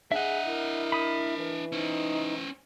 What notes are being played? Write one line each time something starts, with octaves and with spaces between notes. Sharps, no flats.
D4 G#4 D#5 E5 F#5
E4 A#4
B5 D#6
E3
C#4 D#4 C5